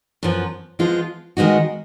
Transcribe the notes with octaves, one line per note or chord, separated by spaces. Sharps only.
F#2 F3 B3
F3 G#3 B3 F4
D#3 G#3 B3 D#4 F#4